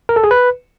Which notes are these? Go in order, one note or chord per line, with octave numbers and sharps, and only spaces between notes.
A#4
A4
G#4
B4